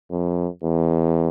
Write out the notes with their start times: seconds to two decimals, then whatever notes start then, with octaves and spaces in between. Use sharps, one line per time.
0.11 F2
0.64 E2